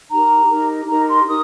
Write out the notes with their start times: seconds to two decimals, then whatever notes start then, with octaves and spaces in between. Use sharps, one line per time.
0.11 D#4 G4 A#4 A#5
0.50 D#4 G4 A#4
0.88 D#4 G4 A#4 A#5
1.08 C6
1.27 D#4 G4 A#4 D#6